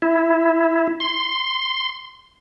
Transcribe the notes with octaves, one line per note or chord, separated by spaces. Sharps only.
E4
C6